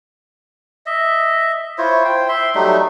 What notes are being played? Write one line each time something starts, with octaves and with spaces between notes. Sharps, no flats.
D#5 E5
E4 F4 C5 C#5
C5 G5
E5 C6
F#3 G3 A3 D#4